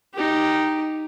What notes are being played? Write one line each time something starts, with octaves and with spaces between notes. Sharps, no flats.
D#4 G4